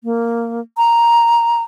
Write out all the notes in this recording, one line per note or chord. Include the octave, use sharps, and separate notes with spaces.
A#3
A#5